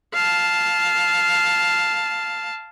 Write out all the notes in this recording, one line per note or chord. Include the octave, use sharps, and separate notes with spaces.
F5 A5